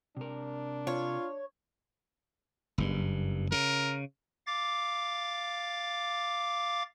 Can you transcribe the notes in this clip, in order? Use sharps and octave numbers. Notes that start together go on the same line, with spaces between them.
C3 D4 A#4
F4 C#5
F#1 G2
C#3 A#4
F5 D6 A6